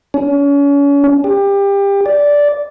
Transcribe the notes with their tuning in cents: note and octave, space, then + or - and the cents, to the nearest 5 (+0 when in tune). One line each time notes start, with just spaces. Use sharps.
C#4 +35
G4 +25
D5 -10